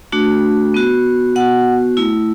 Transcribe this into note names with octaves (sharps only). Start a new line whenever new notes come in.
A3 D4 F#4
B3 F#4
B3 F#4 F#5
A3 E4